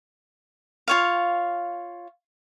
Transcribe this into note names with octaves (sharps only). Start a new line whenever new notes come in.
F4 C#5 F5